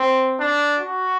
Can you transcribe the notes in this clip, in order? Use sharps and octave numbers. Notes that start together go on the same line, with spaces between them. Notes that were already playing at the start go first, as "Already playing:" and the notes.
Already playing: C4
D4
F#4